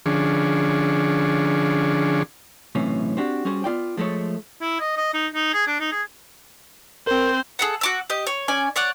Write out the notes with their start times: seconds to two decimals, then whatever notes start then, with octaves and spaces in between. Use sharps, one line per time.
0.06 D3 F3 C#4 D4 G#4
2.75 B1 A2 C3 E3 C#4
3.17 C4 D4 F#4 G4 C5
3.45 G3 C#4 F#4 G#4 C5
3.64 B3 F4 D5 G5
3.97 F3 G#3 A3 A4 C#5
4.61 E4
4.80 D#5
4.96 D#5
5.14 D#4
5.35 D#4
5.53 G#4
5.67 D4
5.80 D#4
5.92 G#4
7.07 C4 A#4 C5
7.59 G#4 A4 F#5
7.81 F#4 D6 E6
8.10 G4 D#5
8.27 C#5
8.48 C#4 D5 G#5
8.76 C#5 D5 F#5